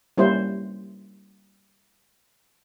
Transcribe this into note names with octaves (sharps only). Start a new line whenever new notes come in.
G3 A#3 C#4 E4 C5